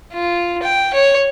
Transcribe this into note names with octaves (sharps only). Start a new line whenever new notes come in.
F4
G5
C#5